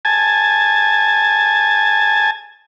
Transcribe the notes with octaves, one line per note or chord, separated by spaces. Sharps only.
G#5 A5